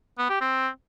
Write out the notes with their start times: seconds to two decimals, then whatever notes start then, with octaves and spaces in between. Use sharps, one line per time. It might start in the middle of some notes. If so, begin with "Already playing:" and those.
0.18 B3
0.30 G4
0.41 C4